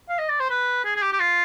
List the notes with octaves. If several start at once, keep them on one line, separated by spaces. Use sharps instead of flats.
F5
D#5
D5
C5
B4
G#4
G#4
G4
G4
F4